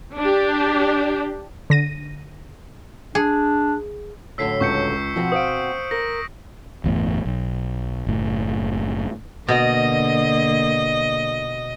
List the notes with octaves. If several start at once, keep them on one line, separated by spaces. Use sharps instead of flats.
D4 G4
D3 A#6 D#7
D4 G#4
A2 D3 F#3 E6 B6 C7
C#2 C#6 G6 C#7
B2 F3 C4 F#4
C5 F5 D#6 D7
A#4 A#6
G1 E2 A2
B1
F#1 A2
B2 D3 A#3 D#5